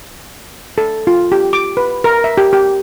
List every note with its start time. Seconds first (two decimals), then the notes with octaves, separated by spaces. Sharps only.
0.78 A4
1.07 F4
1.32 G4
1.53 D6
1.77 B4
2.04 A#4
2.24 E5
2.38 G4
2.53 G4